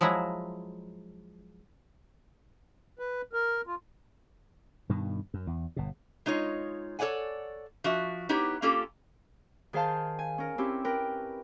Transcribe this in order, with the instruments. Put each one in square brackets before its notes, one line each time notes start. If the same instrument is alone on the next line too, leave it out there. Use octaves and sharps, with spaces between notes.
[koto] F3 F#3 G#3 E4 A#5
[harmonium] B4
A#4
F4
[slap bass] G2 B2 D#3
F#2
E2
G1 B2
[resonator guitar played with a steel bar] G#3 D#4 F4 C#5
A4 C#5 D5 F#5 G#5
F3 F#4 E5
B3 D#4 E4 G4 C#5
A#3 C#4 F4 G4 A4
[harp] D#3 G#4 C5 F5 A5 G6
G#5
C#4 A#4
C4 C#4 E4 G4
A#4 B4 G5